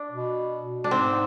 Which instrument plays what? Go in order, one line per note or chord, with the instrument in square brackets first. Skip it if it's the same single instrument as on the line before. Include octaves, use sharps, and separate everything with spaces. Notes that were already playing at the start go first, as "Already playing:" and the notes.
Already playing: [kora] D4
[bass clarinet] B2
[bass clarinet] B2 [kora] D4
[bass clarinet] G#2 [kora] C4